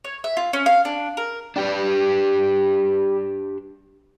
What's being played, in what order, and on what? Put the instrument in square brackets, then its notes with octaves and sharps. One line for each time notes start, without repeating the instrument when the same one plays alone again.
[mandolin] C#5
E5
F4
C#4
F5
D4
A#4
[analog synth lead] G3 [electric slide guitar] D4 G4 B4